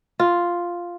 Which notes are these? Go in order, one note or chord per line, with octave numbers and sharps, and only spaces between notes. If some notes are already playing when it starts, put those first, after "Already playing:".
F4